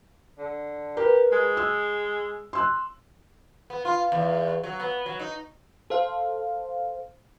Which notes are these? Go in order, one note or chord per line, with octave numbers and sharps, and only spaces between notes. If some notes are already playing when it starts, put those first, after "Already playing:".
D3
G4 A#4 B4
G#3
E6
C6 E6 F#6
B3
F4
E2
F#3
B3
F#3
D#4
A4 C5 F5